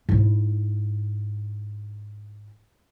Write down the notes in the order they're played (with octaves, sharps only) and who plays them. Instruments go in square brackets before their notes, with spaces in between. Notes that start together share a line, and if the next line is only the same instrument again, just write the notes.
[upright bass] G#2 E4